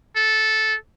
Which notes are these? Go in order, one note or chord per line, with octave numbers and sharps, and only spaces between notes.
A4